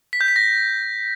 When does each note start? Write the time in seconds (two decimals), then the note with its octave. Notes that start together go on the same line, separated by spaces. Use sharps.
0.13 B6
0.21 G6
0.28 B6
0.36 A#6